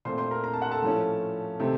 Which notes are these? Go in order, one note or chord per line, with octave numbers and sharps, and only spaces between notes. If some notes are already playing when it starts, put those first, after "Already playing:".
A#2 A3 C4 C5 C6
C5 C6
A#4 A#5
A#5
A5
F#5
A4 A5
A2 F3 A3 C#4
C3 D#3 A3 C4